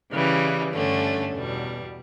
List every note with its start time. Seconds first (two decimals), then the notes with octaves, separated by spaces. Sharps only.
0.13 C#3 E3 G3
0.73 G2 D3 A3 C#4
1.34 E2 B2 G3